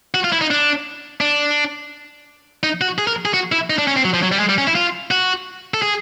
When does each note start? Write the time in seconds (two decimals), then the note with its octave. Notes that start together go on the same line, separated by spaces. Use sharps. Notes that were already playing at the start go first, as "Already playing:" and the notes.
0.14 F#4
0.24 F4
0.32 E4
0.41 D#4
0.50 D4
1.21 D4
2.63 D#4
2.81 F#4
2.98 G#4
3.07 A#4
3.25 G#4
3.34 F#4
3.52 E4
3.70 D#4
3.78 D4
3.87 C#4
3.97 C4
4.05 F#3
4.14 F3
4.23 F#3
4.32 G3
4.40 G#3
4.49 G3
4.58 C#4
4.67 E4
4.75 F4
5.11 F#4
5.74 A4
5.82 G#4